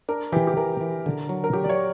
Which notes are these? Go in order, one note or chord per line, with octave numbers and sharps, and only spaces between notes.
D4 A#4
E3 G4
G4
E3 A#4
E3
D3
F#3
A#4
F#3 G4
D5
C#5